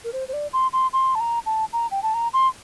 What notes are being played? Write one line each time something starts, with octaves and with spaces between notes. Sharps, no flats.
A#4
C5
C5
D5
C6
C6
C6
A5
A#5
A5
A#5
G5
A5
A#5
C6